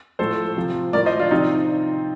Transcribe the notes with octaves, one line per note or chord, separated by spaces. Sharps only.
A2 F3 A4 C5
C3 F3
A2 A#4 D5
F3
C5 D#5
D4 F4
C3 F3 C4 D#4